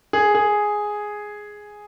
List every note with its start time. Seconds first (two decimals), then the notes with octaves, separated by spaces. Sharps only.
0.13 G#4
0.35 G#4